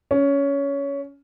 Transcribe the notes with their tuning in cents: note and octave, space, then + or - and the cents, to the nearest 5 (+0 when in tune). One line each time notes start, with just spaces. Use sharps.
C#4 +15